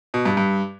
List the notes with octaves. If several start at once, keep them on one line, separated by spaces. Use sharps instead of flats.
B2
G2
G2